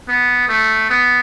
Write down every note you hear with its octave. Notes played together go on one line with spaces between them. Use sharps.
B3
A3
B3